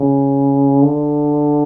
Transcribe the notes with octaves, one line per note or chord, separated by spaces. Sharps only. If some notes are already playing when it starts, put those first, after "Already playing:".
Already playing: C#3
D3